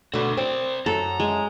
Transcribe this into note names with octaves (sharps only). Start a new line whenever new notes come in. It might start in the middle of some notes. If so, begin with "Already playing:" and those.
B2 D3 A3 F#4
C4 C5 D5
F#2 A4 A#5
G#3